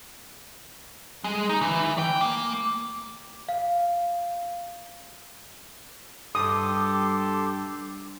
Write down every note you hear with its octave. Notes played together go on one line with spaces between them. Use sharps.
G#3
D#4
E3
G5
A#3
F5
G2 G4 A4 C6 D6 D#6